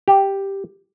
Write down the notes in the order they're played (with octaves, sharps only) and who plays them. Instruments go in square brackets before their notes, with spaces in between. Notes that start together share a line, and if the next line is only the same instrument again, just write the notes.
[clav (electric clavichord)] G4